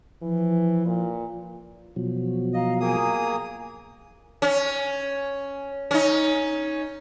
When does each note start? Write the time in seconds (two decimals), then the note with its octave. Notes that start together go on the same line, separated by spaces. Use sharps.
0.22 E3 F3
0.86 A#2
1.96 B2 F3 F#3
2.54 D#5 F5 A#5
2.80 A#3 G#4 G5 G#5 A#5 D#6
4.42 C#4
5.91 C#4 D#4